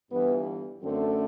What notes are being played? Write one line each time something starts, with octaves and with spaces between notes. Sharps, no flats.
G1 G2 E3 B3
F#2 D3 A3 C4